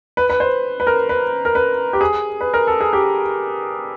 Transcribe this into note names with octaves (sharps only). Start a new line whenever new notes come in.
B4
B4
C5
B4
A#4
B4
A#4
B4
G4
G#4
B4
A#4
A4
G#4
G4